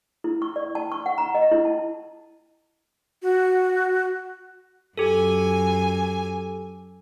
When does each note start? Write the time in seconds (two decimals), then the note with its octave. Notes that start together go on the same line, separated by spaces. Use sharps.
0.24 E4
0.42 C#6
0.56 D5
0.75 A5
0.92 C#6
1.06 F#5
1.18 A#5
1.35 D#5
1.51 E4
1.65 A5
3.22 F#4
4.97 F#2 G4 A4 G#5